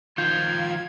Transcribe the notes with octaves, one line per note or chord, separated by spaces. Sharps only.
D#3 F3 F4 G6 G#6